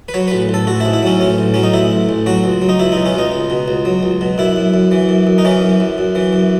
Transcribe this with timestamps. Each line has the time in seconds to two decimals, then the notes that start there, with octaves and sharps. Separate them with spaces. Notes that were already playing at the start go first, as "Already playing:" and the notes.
0.09 B4
0.14 F#3 C#5
0.28 A1 B4
0.49 A1 A4
0.67 A1 F#4
0.80 E4
0.85 G#2
0.93 E4
1.03 F#3 C#4
1.20 A1 C#4
1.38 A1
1.54 F#3 C#4
1.63 D#4
1.74 A1 E4
1.91 A1
2.09 A1
2.26 F#3 F#4
2.44 C#2
2.62 F#3
2.69 D#4
2.80 C#2 E4
2.92 B2 D#4
3.06 C#4
3.15 C#2 D#4
3.32 C#2
3.50 B2
3.68 C#2
3.85 F#3
4.03 C#2
4.21 B2
4.38 F#2 E4
4.56 F#2
4.74 F#2
4.91 E3
5.09 F#2
5.27 F#2
5.38 D#4
5.45 E3 C#4
5.62 F#2
5.80 F#2
5.98 F#2
6.15 E3
6.33 F#2